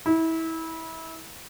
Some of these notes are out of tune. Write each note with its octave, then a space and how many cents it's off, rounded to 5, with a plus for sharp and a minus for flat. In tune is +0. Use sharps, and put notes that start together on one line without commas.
E4 -25